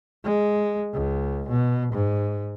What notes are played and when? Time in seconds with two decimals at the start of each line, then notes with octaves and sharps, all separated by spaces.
0.24 G#3
0.93 C#2
1.49 B2
1.93 G#2